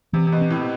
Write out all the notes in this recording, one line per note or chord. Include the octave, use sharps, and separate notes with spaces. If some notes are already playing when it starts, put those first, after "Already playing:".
C3 E3
C3
B2
C4
A2
C3